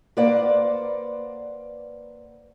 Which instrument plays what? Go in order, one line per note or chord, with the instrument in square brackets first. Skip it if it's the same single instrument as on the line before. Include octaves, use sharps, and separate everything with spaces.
[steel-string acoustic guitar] A#3 B4 C5 D5 F#5